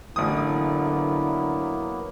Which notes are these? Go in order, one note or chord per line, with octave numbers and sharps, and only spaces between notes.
A1 D3 F#3 A#3 B3 E4 D#6